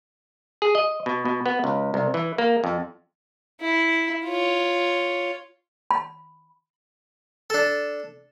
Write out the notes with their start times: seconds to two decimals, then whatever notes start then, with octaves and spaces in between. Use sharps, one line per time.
0.62 G#4
0.75 D#5
1.06 B2
1.25 B2
1.46 B3
1.64 C#2
1.94 C2
2.14 E3
2.38 A#3
2.64 F2
3.61 E4
4.25 F4 C#5
5.91 B5
7.50 D4 A4